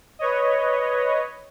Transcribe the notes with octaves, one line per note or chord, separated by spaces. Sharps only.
B4 C#5 D#5